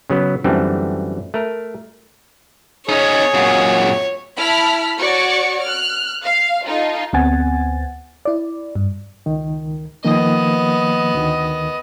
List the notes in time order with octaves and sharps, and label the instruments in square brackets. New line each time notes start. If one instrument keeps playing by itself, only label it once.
[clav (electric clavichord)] C#3 F#3 B3
F#2 D3 E3 G3 A3 C4
A3 A#4
[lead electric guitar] C#4 D#4 [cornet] G#4 [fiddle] C#5
[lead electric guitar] F#2 A#2
[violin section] E4 A5 B5 F6 B6
F#4 C#5 D5 C#6
F6 F#6
F5
D#4 F4 A4
[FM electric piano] D2 B3 C4 F#5 G#5 A6
E4 D5
G2
[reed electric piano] C#2 D#3
[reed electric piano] D#3 F3 A#3 [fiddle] B3 D#5
[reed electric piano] D2 D#3